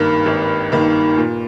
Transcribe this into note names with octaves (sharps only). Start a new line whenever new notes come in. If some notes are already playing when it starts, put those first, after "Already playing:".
Already playing: G#1 G2 D#3 A#3
G#1
G2 D#3 A#3
A#2